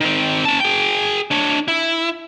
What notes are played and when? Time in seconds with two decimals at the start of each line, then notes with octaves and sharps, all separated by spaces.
0.01 D#3 C4
0.45 C#4 A5
0.60 G#4 G5
1.31 D4 C#5
1.68 E4